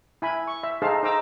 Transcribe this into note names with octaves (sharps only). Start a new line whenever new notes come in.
E4 G#5 B5
C#6
E5
D#4 G#4 A4 C5 F5 A5
D#4 C5 A#5 D6 E6